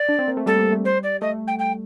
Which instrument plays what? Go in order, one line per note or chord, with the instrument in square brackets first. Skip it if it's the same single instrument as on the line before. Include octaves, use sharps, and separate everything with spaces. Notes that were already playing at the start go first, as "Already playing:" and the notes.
Already playing: [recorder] D5
[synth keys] D4
C4
A#3
A3
[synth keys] G3 [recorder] A4
[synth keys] A#3
A3
[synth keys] G3 [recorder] C5
[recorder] D5
[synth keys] A3 [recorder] D#5
[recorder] G5
G5